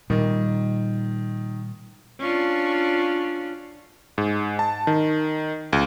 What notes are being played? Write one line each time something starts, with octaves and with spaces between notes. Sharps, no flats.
A#2 D#3 G3
C#4 D4 F4
G#2
A5
D#3
C#2